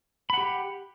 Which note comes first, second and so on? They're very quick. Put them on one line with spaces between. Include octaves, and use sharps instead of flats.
B5 F#5 G4